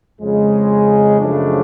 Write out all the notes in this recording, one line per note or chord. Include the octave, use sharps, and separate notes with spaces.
F2 C#3 G#3
F#2 C#3 F3 A3 D4